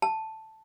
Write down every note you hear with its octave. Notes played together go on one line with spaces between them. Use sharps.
A5